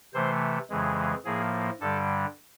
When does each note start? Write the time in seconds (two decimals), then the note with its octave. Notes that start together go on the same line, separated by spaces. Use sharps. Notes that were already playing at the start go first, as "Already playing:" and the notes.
0.14 C3 E3 A3 C5
0.70 F2 C#3 E3 G#3
1.24 A2 F3 A#3 G#4
1.80 G2 D3 G3 A4